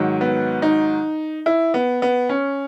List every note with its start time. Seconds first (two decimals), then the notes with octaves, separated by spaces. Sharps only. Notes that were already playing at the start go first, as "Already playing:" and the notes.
Already playing: G#2 D#3 F#3
0.21 B3
0.62 D#4
1.46 E4
1.74 B3
2.02 B3
2.29 C#4